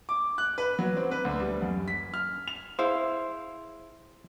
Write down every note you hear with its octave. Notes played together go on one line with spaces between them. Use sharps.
D6
F#6
B4
F#3
C4
B4
D2
G3
F#2
B6
F6
F7
E4 G#4 C5 F5